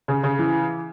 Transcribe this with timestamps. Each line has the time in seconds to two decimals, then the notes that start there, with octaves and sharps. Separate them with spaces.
0.08 C#3
0.23 C#3
0.39 E3